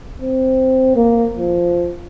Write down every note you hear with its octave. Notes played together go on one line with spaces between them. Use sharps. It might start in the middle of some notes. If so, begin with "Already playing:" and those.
C4
A#3
F3